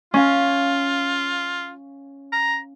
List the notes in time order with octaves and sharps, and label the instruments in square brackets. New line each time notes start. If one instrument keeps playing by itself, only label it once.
[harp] C#4 F5 [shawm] F4
[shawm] A#5